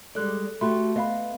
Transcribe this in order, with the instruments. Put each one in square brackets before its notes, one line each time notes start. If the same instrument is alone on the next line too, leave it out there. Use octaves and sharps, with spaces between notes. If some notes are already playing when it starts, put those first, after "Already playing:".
[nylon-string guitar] G3 G#3 D5 [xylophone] A4 F#6
[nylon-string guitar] A3 F#4 G4 [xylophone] E5 B5 C6
[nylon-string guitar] B3 [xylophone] D#5 F5 B5